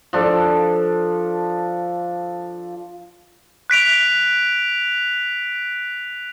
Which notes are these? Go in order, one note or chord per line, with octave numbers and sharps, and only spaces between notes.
F3 D4 A4
F#6 B6 D7 F7